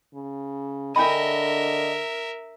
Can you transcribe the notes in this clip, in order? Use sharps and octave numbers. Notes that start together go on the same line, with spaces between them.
C#3
D3 D4 A#4 D#5 E5 G5 B5